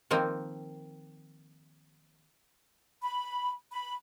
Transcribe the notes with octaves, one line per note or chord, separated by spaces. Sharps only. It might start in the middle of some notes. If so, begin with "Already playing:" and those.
D#3 F3 A#3 C4
B5
B5